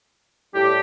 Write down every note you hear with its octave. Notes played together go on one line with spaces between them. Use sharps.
A2 G3 D4 G4